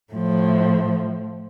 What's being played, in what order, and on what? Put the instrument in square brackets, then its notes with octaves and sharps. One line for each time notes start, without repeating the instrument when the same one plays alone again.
[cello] A2 F3